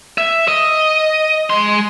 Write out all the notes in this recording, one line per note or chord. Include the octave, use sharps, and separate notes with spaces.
E5
D#5
G#3 C6